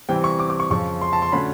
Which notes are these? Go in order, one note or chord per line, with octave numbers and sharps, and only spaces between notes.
C3 E3 G3 C4 G5
C#6
D6
D6
C#6
F2 C#3 F3 C#6
C6
A5
C6
D3 F#3 A3 C#4 B5